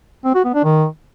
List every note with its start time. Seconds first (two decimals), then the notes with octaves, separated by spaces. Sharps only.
0.25 C4
0.35 F#4
0.44 B3
0.54 D4
0.64 D#3